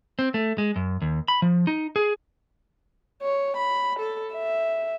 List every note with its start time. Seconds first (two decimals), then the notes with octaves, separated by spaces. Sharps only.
0.19 C4
0.34 A3
0.58 G#3
0.76 F#2
1.02 D#2
1.28 B5
1.42 F3
1.67 D#4
1.96 G#4
3.22 C#5
3.57 B5
4.00 A4
4.33 E5